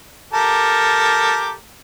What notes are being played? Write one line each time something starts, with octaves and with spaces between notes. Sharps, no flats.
G4 A4 A#4